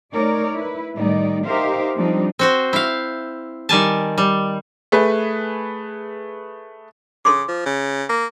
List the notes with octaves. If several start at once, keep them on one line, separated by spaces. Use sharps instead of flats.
A3 D#4 A#4 C#5 D5
E4 B4
A2 D#3 G3 D#4 D5
D#4 G4 A#4 C5 E5 F5
F3 G3 C4 D4 D#4
C4 F#4 C5
E4 F5
D#3 G3 G#5 A5
G3
A3 G#4 B4
C#3 A4 C6 D6
F3
C#3
A#3